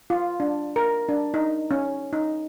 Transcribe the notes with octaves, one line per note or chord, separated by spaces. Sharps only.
F4
D4
A#4
D4
D#4
C#4
D#4